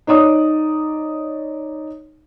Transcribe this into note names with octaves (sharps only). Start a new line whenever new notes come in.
D#4 C#5 D5 D#6